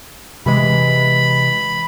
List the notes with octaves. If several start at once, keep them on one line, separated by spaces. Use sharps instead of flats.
C3 E3 G#3 B5